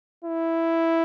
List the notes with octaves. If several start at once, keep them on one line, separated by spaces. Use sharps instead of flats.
E4